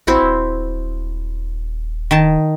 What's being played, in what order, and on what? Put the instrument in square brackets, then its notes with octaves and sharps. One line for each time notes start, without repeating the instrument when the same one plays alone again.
[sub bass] A1 [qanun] C4 E4 F#4
[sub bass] D#1
[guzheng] D#3 A5